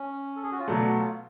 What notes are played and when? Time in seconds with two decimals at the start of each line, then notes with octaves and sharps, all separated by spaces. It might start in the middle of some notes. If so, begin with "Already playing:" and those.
Already playing: C#4
0.36 A4
0.43 G#4
0.52 F#4
0.59 F4
0.67 B2 F#3 A3 D4
0.78 D4
0.88 F#4
0.98 F4